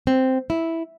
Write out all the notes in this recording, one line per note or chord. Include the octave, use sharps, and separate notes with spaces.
C4
E4